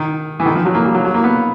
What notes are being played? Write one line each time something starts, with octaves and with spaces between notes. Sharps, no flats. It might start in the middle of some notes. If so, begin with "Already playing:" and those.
Already playing: D#3
E3
D#3
F3
F#3
A#3
G3
F#3
F#3
A#3
B3